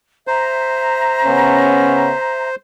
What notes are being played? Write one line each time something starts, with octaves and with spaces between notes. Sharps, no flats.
C5 E5 A#5
C#3 B3 C#4